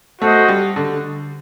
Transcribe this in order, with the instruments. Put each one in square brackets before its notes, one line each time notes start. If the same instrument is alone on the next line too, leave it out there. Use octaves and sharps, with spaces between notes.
[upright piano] A3 [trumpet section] F#4 C5 D#5
[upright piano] G3
D3